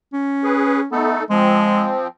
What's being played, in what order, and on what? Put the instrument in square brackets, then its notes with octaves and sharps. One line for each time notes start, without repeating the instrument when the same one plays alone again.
[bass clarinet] C#4
[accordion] G#4 B4
[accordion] A3 D#4 A4 [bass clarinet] B3
[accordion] F3 C4 [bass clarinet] G#3